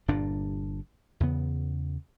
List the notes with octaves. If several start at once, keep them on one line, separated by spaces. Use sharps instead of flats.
G1 G2 A#2 D4
E2 C#3 B3